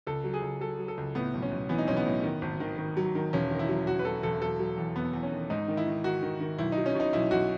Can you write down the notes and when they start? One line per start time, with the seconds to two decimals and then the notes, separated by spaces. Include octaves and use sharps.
0.07 C#2 A4
0.24 F#3
0.34 G#4
0.42 C#2
0.60 F#3 A4
0.79 F#3
0.88 A4
0.97 C#2
1.15 A2 B3
1.34 B1
1.42 C#4
1.51 B1
1.69 E3 B3
1.78 D#4
1.87 B1 C#4
1.97 B3
2.06 A2
2.23 D#3
2.41 G#1
2.60 D#3
2.78 D#3
2.97 F#3
3.15 D#3
3.33 E1 C#4
3.51 D#3
3.59 E4
3.69 F#3
3.87 E1 F#4
3.99 B4
4.05 F#3 A4
4.23 E1 A4
4.41 F#3 A4
4.59 F#3
4.78 E2
4.96 E2 B3
5.13 E2
5.23 C#4
5.32 D#3
5.50 G#2 D#4
5.68 D#3
5.77 E4
5.87 D#3
6.04 D#3 F#4
6.22 D#3
6.40 D#3
6.58 B1 E4
6.72 F#3 D#4
6.86 C#4
6.95 B2 D#4
7.13 B1 E4
7.31 B1 F#4